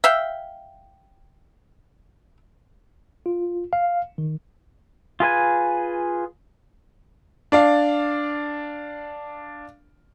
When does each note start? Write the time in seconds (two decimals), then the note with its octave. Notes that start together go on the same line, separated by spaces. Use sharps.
0.04 E5 F5 G5
3.26 F4
3.73 F5
4.18 D#3
5.20 F4 G#4 B4 G#5
7.52 D4 D5 F5